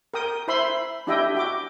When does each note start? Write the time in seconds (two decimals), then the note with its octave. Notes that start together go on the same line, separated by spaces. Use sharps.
0.14 A#4 G5 D#6
0.48 E4 C5 E5 B5 C6
1.07 D4 E4 G4 D#5 E5 G5
1.35 F#4 G5 D6